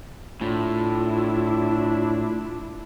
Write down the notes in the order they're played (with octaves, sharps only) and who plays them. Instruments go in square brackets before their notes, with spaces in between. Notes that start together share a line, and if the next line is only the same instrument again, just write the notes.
[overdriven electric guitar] A2 [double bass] D4 E4 [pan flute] F4